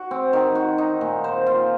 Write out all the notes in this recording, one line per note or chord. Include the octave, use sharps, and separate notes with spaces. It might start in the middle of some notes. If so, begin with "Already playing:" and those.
Already playing: F#4
C4
D#3
F#4
D#4
A#2
C5
F4